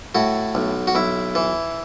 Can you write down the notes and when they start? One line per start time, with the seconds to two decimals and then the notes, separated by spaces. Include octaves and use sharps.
0.15 A2 F#4
0.55 B1
0.87 F#4
0.95 B1 E4
1.35 E3